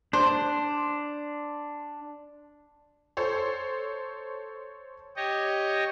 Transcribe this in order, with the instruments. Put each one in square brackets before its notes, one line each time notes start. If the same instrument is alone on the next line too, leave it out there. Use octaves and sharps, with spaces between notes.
[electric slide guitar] D4 [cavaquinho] C5
[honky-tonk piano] A4 C5 C#5
[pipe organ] G4 C#5 D#5